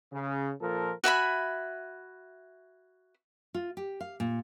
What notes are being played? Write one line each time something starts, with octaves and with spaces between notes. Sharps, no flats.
C#3
A#2 F3 A4 A#4
F#4 E5 G#5 B5
F4
G4
F5
A#2